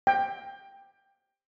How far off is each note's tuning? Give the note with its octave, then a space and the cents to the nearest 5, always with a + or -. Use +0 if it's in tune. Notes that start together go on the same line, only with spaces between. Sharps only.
G5 +15